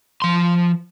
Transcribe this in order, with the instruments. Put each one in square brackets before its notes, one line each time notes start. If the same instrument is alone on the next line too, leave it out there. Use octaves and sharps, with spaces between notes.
[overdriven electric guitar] F3 C6